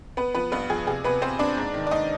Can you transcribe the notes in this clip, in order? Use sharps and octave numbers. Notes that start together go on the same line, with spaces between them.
B3 B4
F3 B3 B4
G2 B3 B4
F3 G#4
C3 G#4
C3 B3 B4
B3 C4 C5
B3 D4 D5
G#2
D#3
D5
G#2 D#4 D#5